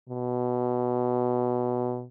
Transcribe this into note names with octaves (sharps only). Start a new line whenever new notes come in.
B2